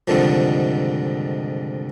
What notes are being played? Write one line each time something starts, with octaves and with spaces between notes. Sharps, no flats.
C2 F2 G#2 D3 D#3 F3